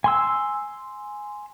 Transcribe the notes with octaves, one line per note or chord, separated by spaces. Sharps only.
G#5 C6 E6